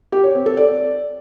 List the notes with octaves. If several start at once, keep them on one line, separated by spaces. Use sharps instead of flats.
G4
C#5
C4
A4
D5